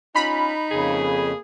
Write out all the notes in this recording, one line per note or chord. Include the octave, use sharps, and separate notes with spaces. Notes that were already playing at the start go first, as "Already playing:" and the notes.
C#4 D#4 F4 B5
F2 C#3 A#3 G#4